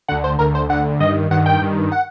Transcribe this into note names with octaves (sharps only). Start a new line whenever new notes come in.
D2 D3 F#5
C5
D2 D3 A#4
C5
D2 D3 F#5
G2 D#3 D#5
G2 D#3 F#5
G5
G2 D#3
F#5